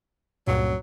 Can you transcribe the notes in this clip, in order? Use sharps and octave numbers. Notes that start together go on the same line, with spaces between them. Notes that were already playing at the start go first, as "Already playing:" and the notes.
C#2 G2 A#2 F#3